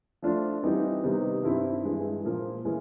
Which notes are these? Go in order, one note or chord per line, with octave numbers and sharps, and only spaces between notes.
F3 A3 D4 F4
E3 G3 C4 D#4 G4
C3 D#3 G3 B3 D#4
G2 D#3 G3 C4 E4
G2 E3 G#3
A#2 F3 A#3
E3 G#3 C#4